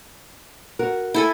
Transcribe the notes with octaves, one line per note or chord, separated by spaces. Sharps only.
F#4 A#4
E4 A4 G#5